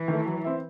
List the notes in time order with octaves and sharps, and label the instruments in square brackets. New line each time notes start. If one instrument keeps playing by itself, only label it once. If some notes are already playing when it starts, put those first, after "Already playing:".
Already playing: [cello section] E3
[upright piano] D#3 A3
F#3
C4 E4